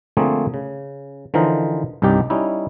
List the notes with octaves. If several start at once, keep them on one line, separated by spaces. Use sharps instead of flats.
D3 F3 A3 A#3 C4 G#4
C#3
D3 E3 F3 D#4 A#4 C5
C2 G2 C#4 D#4 G4 D5
G3 C#4 D#4 E4